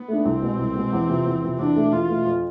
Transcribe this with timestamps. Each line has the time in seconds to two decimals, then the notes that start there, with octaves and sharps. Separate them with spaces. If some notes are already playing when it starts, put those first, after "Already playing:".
Already playing: B3
0.08 A3 D4
0.25 C2 C4
0.42 B2 G#3
0.59 C2
0.75 B2 G#3
0.93 E2
1.09 C3 F3 B3
1.26 E2
1.42 C3 F3 B3
1.59 E2 D4
1.76 B2 A3
1.93 E2 F4
2.09 B2 A3
2.25 F2